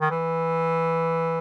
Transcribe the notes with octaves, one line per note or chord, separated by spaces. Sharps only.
D#3
E3